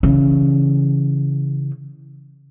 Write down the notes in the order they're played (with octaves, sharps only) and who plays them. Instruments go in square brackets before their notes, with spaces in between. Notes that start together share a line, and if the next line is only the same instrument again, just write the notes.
[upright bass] C#3 E3